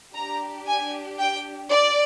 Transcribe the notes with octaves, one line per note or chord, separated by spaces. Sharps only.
D4 G4 A#5
G#5
G5
D5